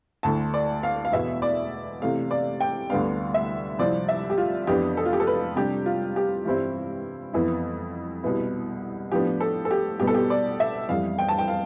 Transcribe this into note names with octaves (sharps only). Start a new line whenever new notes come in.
D2 D3 A3 E4 A5
D5
F5
F5
E2 B2 B3 E4 E5
D5
C3 E3 A3 F5
D5
G5
D2 D3 G3 B3 D4 F5
E5
C2 C3 F3 C4 E4 D5
E5
G4
F4
F2 E3 B3 D4 G4
A4
F4
G4
A4
B4
C3 G3 D4 G4
F4
G4
G2 E3 G3 C4 E4
F2 E3 B3 E4
C2 B2 B3 E4
A2 F3 B3 D4 G4
A4
A4
G4
C2 B2 G3 B3 G4
A4
G4
D5
E5
F2 E3 G3 F5
G5
A5
G5
F5